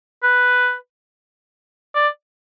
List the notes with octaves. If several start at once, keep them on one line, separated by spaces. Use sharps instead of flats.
B4
D5